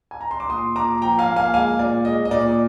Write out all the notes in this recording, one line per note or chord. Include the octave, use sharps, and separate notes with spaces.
G#5
A#5
C6
D6
A#2 C6 D#6
A#2 A#5 D6
F3 G5 A#5
F5 G#5
A#3
F5 G#5
G#3 F5 G#5
A#2 D5
G#3 D#5
D#5
A#2 D5